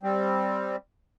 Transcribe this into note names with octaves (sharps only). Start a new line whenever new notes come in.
G3 C4